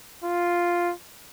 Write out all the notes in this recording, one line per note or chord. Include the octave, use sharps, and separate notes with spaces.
F4